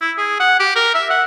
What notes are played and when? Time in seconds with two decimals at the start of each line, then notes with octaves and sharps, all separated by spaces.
0.01 E4
0.18 G#4
0.40 F#5
0.60 G4
0.76 A#4
0.94 E5
1.10 F#5